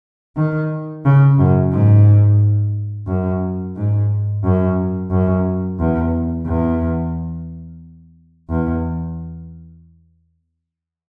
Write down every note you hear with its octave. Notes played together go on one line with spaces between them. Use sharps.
D#3
C#3
F#2
G#2
F#2
G#2
F#2
F#2
E2
E2
E2